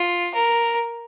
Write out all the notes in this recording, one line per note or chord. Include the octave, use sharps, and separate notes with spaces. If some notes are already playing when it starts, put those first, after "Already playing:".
Already playing: F4
A#4